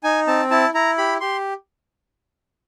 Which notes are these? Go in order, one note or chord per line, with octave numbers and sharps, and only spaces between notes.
D#4 G#5
C4 A5
E4 A5
E4 A#5
G4 B5
G4 C6